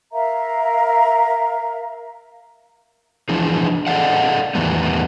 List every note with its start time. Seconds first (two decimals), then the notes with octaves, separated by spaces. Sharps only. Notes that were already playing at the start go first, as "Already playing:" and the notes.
0.12 A#4 E5 F5 A#5
3.29 E3 F3 D4 G#4
3.87 G#4 A4 D5 D#5 F5 F#5
4.55 E2 A2 D#3 E3 G3 B3